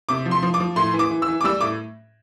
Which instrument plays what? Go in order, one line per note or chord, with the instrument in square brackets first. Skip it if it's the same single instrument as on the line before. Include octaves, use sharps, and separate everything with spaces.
[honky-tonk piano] C3 D6
F3
C6
F3
D6
F3
A2 C6
E3
D6
E3
E6
E3
D6
G3 E6
A2 D6